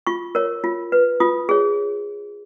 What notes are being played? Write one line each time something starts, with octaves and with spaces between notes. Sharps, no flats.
F4 C#6
A#4 C#5
F4
B4
F4 D#6
G#4 C#5